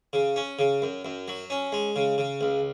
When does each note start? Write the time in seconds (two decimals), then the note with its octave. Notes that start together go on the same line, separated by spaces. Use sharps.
0.13 C#3
0.36 C#4
0.59 C#3
0.82 F#2
1.05 F#2
1.28 F#3
1.50 C#4
1.72 G#3
1.96 C#3
2.18 C#3
2.41 C#2